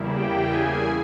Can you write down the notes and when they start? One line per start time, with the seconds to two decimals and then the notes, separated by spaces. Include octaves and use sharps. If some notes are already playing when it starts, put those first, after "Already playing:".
Already playing: E2 C#3 G3 A#3 E4
0.17 G4 G5
0.52 G#4 G#5